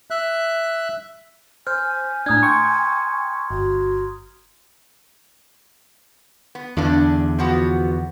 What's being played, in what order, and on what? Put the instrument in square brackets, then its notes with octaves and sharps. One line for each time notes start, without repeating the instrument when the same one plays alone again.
[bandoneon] E5 F#6
[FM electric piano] C5 [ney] G#5 [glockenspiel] F6 G6
[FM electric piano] A2 D4 [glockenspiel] A#5 D#6 G#6
[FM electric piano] G5 C#6 [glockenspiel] C6
[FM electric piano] G1 [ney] F#4
[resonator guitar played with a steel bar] B3
[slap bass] E2 D3 [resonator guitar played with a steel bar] G2 D4
[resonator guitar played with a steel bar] F3 B3 F#4